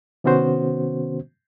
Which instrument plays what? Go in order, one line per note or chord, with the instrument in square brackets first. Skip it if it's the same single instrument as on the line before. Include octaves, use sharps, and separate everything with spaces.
[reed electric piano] C3 D#3 B3 C#4 F#4 C5